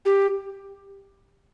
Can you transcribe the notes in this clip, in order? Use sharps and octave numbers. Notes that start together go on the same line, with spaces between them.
G4